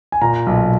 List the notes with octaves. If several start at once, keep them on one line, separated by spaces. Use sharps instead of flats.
G#5
A#2 A#5
B1